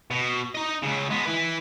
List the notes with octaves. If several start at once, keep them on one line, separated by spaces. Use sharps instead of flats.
B2
D#4 D#5
C#2 C#3
G#3 B3
E4 B4